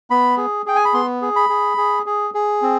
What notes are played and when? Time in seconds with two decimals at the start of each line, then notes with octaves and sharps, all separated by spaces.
0.10 B3 B5
0.37 G#4
0.66 G#4 G5
0.76 G#5
0.85 B5
0.94 B3 C6
1.22 G#4
1.36 B5
1.49 G#4
1.77 G#4
2.06 G#4
2.34 G#4
2.62 C4